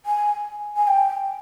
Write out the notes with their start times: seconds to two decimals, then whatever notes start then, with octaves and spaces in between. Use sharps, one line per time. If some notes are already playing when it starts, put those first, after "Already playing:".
0.06 G#5
0.76 G#5
0.87 G5